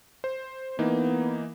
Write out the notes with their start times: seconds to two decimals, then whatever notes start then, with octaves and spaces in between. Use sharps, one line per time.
0.24 C5
0.79 E3 A#3 B3 D#4